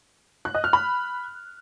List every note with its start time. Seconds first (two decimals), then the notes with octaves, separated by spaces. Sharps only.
0.45 F#6
0.55 D#5
0.64 F6
0.73 B5